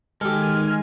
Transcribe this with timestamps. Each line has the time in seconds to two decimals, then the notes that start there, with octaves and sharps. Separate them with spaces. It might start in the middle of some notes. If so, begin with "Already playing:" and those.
0.21 D#3 G#3 G4 A4 G#5 F6